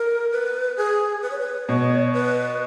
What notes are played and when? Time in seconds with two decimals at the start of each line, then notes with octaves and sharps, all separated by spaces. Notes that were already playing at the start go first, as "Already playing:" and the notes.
Already playing: A#4
0.31 B4
0.77 G#4
1.22 B4
1.31 C#5
1.39 B4
1.68 B2 C#5
2.13 B4